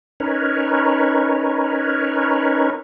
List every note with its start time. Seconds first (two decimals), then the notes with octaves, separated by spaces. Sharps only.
0.20 C#4 D#4 A#4 B4 C#5